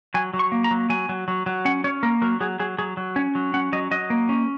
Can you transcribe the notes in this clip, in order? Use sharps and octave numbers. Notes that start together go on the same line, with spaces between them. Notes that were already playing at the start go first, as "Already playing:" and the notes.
F#3 G#5
F#3
C#6
A#3
A#5
F#3
F#3 G#5
F#3
F#3
F#3
C#4 F#5
C#4 C#5
A#3 A#4
F#3 A#4
F#3 G#4
F#3 G#4
F#3 G#4
F#3
C#4 C#5
F#3
C#4 F#5
F#3 D#5
F#3 D#5
A#3
C#4